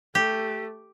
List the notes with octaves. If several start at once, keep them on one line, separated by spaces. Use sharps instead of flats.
A3 G4